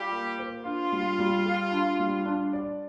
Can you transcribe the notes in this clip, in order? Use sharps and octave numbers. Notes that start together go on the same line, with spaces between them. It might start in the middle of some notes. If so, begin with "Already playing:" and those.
Already playing: G3 F4 G4
A#3
C5
D4 F4
G3
G3
G4
D4
G3
D4
D5